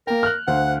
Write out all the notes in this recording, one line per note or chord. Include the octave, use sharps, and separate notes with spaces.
A#3 A#4 G5
F6 F#6
D2 C5 F5 F#5